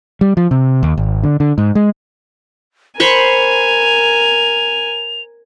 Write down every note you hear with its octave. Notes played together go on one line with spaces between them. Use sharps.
G3
F3
C3
D#2
G#1
D3
D3
G#2
G#3
A#4 C5 G#5 B5 C#6 F7